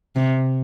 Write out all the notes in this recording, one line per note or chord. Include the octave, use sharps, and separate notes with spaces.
C3